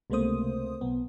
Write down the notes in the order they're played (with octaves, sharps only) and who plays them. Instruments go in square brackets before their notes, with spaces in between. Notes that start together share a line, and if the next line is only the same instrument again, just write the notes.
[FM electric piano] C#2 C3 A3 A#3 C5 D#6
B1 B3